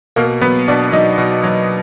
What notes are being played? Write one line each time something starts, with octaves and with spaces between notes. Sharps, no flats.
B2 A#3 A#4
F#3 B3 B4
B2 D4 D5
F#3 D#4 D#5
B2
F#3